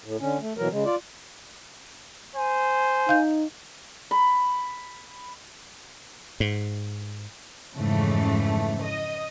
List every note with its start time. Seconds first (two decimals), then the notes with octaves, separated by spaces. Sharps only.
0.04 A2
0.21 D3 C#4
0.41 A3
0.57 B2 E3 F#3 A#4
0.71 C#3 G#3
0.85 F4 D5
2.35 C5 G#5
3.09 D#4 F5 G6
4.11 B5
6.40 G#2
7.76 F2 G#2 C#3 E3 A3
8.83 D#5